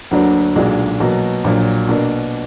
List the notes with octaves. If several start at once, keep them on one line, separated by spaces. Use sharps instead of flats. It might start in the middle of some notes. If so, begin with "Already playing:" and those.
D2 D3 F#3 A#3 D4
B1 A#2 G#3 D4 F#4
B2 F#3 A#3
A#1 A#2 F#3
B2 A#3 D4